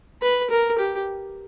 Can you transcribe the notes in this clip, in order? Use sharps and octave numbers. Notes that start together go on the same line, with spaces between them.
B4
A#4
G4